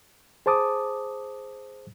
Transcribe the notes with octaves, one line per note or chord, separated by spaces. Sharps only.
G#4 C5 A5 D6 D#6